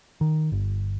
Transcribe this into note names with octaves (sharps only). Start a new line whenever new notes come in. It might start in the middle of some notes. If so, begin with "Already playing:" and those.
D#3
G1